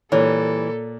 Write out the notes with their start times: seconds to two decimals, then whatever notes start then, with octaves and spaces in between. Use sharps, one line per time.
0.12 A#2 E3 G3 A4 C#5